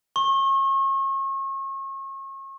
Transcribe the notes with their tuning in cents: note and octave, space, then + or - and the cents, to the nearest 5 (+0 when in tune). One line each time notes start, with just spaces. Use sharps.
C#6 -35